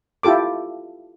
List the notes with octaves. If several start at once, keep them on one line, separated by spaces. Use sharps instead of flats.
E4 F4 G4 A4 D6